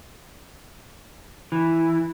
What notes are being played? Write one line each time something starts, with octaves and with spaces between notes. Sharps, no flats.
E3